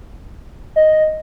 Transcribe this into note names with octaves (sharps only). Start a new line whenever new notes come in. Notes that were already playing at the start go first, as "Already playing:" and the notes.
D#5